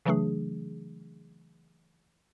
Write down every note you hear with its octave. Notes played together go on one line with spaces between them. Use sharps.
C#3 E3 F#3 A3 D4 G#4